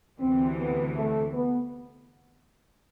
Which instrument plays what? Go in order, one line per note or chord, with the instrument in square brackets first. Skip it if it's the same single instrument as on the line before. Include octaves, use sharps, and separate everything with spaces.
[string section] D2 C3 E3 [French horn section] C4
[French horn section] B3
A3
B3